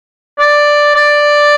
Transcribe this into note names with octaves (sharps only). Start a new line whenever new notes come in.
D5
D5